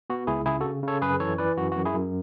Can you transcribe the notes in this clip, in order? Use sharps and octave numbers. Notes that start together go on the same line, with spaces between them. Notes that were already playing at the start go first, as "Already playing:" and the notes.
B3 F#4
C#2 E4 G#4
C#3 E4 G#4
C#3 F#4 A4
C#3 A4 C#5
F#2 G#4 B4
E3 A4 C#5
E3 B4 D5
F#2 F#4
F#2 F#4
E4 G#4
F#2